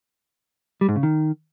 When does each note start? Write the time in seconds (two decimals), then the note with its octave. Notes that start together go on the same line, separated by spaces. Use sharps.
0.81 G3
0.89 G#2
0.96 C#3
1.03 D#3